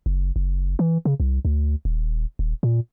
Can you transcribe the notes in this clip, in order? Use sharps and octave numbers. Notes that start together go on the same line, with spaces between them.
F#1
F#1
E3
C#3
C2
D2
D#1
D#1
A#2